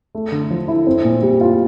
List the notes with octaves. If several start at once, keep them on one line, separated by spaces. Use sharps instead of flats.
A3
D3
F3
E4
C4
A#2
G3
F4